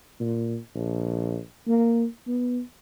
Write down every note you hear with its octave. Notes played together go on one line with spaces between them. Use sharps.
A#2
A#1
A#3
B3